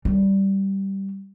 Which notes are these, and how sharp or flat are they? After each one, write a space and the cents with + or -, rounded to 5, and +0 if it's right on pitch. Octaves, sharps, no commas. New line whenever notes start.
G3 -10